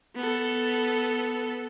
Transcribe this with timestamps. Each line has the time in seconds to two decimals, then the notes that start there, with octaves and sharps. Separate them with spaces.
0.16 B3 A4